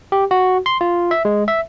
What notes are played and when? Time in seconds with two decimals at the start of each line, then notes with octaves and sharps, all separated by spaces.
0.12 G4
0.31 F#4
0.66 C6
0.81 F4
1.11 E5
1.25 G#3
1.48 E5